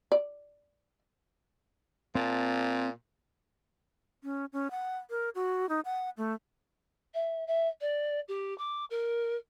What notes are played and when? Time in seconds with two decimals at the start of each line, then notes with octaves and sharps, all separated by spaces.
0.12 D5
2.15 A#2 C4 A5
4.22 C#4
4.53 C#4
4.71 F#5
5.10 A#4
5.35 F#4
5.69 D#4
5.85 F#5
6.18 A3
7.14 E5
7.47 E5
7.81 D5
8.28 G4
8.58 D6
8.90 A#4